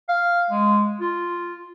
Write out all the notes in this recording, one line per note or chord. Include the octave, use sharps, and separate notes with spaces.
F5
G#3
F4